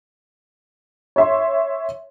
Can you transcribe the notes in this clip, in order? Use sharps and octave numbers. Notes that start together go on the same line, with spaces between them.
C#5 E5 C6